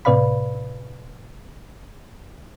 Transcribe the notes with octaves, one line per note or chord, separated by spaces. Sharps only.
A2 C3 B4 D5 F5 B5